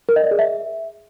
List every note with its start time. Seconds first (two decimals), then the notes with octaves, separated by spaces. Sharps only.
0.09 A#4
0.16 D#5
0.24 D5
0.31 G#4
0.39 E5